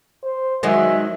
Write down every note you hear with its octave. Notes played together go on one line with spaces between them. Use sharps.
C5
D#3 F#3 G#3 E5